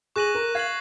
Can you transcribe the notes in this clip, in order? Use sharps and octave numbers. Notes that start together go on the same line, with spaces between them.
G#4 C#6 F#6 A#6 D#7 F#7
A#4
F5 G#6 C7 F#7